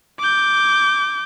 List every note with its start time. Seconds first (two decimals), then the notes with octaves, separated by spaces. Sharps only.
0.19 D6 G6